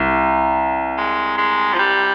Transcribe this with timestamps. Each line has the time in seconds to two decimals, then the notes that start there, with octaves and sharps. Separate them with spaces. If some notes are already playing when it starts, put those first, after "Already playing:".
Already playing: C2
0.98 G#3
1.38 G#3
1.74 F3
1.79 G3